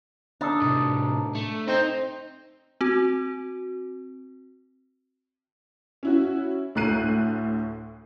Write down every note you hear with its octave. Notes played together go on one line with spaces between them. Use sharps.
D4 D#4 A4
A2 C3
A3
C4 D#4
C4 F#4
C#4 E4 F#4
D2 A2 F#6 C7 D#7